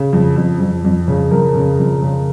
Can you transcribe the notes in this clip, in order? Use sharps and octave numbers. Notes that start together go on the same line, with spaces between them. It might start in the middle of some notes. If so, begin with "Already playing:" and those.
Already playing: C#3
F2
F2
F2
F2
C#3
F2 A#4
C#3
F2
C#3